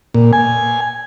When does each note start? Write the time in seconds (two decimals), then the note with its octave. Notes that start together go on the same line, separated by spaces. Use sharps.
0.14 A#2
0.33 G#5